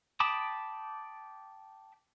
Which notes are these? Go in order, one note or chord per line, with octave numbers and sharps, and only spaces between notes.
G5 A5 B5 D6 D#6